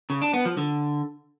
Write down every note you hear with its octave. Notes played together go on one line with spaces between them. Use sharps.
C#3
D4
B3
F3
D3